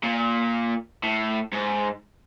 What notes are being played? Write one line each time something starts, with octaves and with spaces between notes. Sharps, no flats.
A#2
A2
G#2